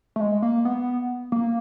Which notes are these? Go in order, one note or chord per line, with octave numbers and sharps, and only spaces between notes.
A3
G#3
A#3
B3
A#3